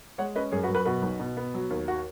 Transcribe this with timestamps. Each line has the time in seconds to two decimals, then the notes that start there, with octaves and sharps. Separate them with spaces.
0.18 G#3 C#5 F#5
0.35 C#4 B4 D#5
0.52 F#2 G#4 C#5
0.63 F#4 B4
0.69 F#2
0.75 F#4 B4
0.85 B2 F#4 B4
1.02 B1
1.20 B2
1.37 B3
1.54 F#3
1.70 D#2
1.88 F#4